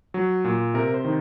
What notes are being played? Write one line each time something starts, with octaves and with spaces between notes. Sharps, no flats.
F#3
A#2
C3 A#4
C5
D#3